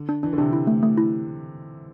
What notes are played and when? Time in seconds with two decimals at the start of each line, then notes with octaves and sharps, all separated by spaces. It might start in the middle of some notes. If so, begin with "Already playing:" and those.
Already playing: D3
0.09 D4
0.23 E3 D4
0.33 D3
0.38 C3 D4
0.53 E4
0.67 A3
0.83 A3
0.98 E4